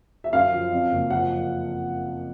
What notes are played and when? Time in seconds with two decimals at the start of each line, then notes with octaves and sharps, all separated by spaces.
0.24 E5
0.33 F#2 F5
0.52 F3
0.72 F2
0.91 F#1
1.10 F3 F#5